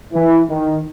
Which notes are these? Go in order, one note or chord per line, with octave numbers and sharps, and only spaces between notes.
E3
D#3